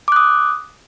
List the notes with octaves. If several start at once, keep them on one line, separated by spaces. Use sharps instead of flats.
D6 D#6 F#6